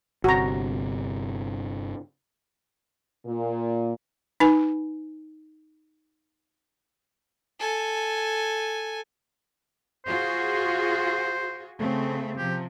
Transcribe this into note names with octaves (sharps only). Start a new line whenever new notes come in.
G1 C3 F#4 A#5
A#2
D#4 B4 G#5
A4 G#5
F4 F#4 G#4 C5
C#3 A3 C4
C3 F3 G4